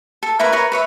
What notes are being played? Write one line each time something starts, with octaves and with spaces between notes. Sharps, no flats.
A4
E4 A#4 B4 C#6
A#4 B4 C#5
B4 C#5 E5